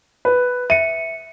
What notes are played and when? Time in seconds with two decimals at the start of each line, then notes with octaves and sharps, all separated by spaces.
0.25 B4
0.70 E5 C#7 D#7